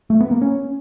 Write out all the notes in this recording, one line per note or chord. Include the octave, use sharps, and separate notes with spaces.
A3
B3
A#3
C#4